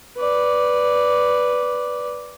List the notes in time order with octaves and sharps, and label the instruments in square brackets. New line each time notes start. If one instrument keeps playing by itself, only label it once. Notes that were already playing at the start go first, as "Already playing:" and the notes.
[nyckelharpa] B4 D5